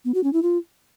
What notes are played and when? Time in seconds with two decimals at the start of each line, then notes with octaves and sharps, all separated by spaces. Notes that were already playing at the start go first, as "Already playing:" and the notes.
0.05 B3
0.14 F#4
0.24 C#4
0.33 E4
0.43 F4